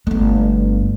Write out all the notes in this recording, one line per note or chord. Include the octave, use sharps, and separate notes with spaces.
G1 A3